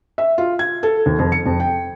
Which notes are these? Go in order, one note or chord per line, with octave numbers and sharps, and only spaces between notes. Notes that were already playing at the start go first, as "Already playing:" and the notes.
E5
F4
G#6
A4
D#2
F2
C#7
F2
G5